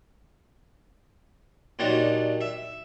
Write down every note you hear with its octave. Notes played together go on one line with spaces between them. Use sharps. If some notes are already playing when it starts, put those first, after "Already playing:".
A#2 F#3 G3 D4 D#4
E5